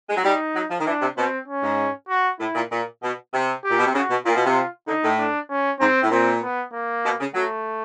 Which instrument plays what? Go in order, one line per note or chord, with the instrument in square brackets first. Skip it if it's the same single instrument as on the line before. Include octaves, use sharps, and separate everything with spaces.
[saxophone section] G#3
F#3
[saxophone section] G3 [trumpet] D#4
[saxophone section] F#3
F3
D#3
[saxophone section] E3 [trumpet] D4
[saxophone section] C3
[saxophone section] B2 [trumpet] C4
[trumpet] C#4
[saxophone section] G#2
[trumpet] F#4
[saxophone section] A2 [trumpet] E4
[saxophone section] A#2
A#2
B2
C3
[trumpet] G4
[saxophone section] A#2
B2
C3
[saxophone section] C#3 [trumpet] F#4
[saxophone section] B2
[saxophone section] A#2 [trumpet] F4
[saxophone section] B2
C3
[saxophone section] D3 [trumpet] D#4
[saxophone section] A2
[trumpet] D4
C#4
[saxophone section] G#2 [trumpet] C4
[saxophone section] A2
[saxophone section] A#2 [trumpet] C4
[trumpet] B3
A#3
[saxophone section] B2
C#3
[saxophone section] F#3 [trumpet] A3